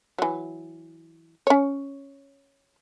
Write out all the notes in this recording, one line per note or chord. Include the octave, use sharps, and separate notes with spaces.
E3 F#3
C#4 C#5